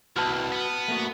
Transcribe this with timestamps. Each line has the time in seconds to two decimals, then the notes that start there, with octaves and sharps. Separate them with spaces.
0.16 C2 F#4 B4 A5 F6
0.52 B3
0.88 A3 A#3 F#4